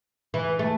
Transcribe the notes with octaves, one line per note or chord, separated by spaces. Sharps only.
E3
A3